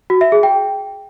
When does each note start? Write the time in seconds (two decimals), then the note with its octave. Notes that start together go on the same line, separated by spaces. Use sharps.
0.10 F#4
0.21 E5
0.32 G#4
0.43 G5